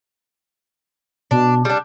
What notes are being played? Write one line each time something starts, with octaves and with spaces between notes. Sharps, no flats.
B2 D4
G3 D4